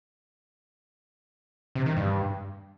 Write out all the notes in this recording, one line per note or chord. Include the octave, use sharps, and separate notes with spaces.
C3
D#3
G2